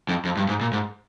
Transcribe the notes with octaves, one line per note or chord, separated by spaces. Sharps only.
F2
F2
G2
G#2
A#2
G#2